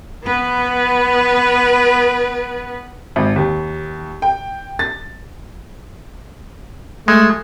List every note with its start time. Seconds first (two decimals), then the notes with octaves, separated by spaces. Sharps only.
0.24 B3 B4
3.16 G#1
3.36 D#2
4.22 G5
4.79 A6
7.08 G#3 A3